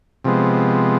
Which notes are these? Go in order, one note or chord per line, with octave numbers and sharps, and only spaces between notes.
C3 F3 G#3 B3